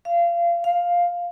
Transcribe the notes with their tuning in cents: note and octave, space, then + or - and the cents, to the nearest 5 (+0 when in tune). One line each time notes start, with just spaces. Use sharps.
F5 -25
F5 +5